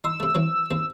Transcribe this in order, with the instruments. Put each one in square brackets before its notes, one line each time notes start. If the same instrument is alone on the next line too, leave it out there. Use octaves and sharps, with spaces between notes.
[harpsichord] D#4 C6 [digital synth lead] E6
[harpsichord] C3 A3
E3 F#3 C4
D#2 C4